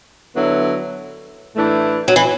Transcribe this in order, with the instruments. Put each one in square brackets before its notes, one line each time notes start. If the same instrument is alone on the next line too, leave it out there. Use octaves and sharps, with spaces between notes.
[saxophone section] D3 F#3 B3 E4
A2 E3 A3 D4
[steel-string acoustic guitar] F#3
E3